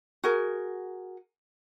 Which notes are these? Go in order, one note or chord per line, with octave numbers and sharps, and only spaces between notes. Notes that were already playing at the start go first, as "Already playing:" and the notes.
F#4 G#4 A#4